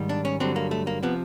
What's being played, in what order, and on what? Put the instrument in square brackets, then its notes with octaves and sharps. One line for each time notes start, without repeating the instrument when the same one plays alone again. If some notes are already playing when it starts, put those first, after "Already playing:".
Already playing: [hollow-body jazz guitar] G#2 D#3 G3
D4
C#4
G2 D3 F#3 C4
A#3
A3
A#3
C3 F3 B3